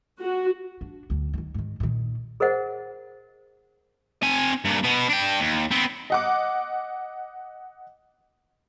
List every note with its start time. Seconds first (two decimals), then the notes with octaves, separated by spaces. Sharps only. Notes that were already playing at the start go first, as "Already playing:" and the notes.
0.20 F#4
0.81 D4
1.10 D2 D3
1.34 D3 D#3
1.54 G#2 D#3
1.80 A#2 D#3
2.40 G#4 A#4 C5 D#5 F#5
4.22 C4 G#5
4.65 G2 A#2
4.83 B2 B3
5.09 D4 G5
5.40 D#2
5.71 B3 C4
6.10 D#5 F#5 D6